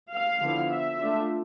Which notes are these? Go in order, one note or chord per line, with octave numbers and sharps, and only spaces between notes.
F5
D3 F3 B3 E4
E5
A3 D4 F4